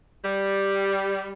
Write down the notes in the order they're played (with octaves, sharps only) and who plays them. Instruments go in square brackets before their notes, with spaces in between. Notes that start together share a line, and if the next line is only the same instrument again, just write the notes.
[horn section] G3